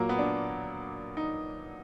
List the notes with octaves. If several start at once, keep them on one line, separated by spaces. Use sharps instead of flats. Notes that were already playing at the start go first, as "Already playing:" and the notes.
Already playing: A#2 F#3 A#3
B3
D4
D#4